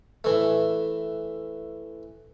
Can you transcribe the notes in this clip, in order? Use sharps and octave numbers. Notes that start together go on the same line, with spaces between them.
E3 A3